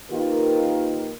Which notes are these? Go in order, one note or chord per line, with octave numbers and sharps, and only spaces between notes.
D#3 A#3 F4 G4 A#4 B4